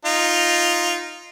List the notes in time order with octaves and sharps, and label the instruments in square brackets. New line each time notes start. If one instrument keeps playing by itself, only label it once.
[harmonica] D#4 F4